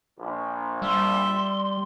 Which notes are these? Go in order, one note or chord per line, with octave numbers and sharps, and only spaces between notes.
A#1
G3 E5 C6